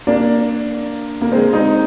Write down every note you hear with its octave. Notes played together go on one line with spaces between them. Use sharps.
A#3 D4
A#3
G#3 C4
C4 D#4